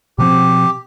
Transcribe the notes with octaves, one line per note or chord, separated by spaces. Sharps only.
B2 F3 C4 G4